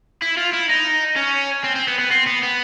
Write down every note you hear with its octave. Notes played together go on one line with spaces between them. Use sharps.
E4
F4
E4
D#4
C#4
C4
C4
B3
B3
C4
B3
B3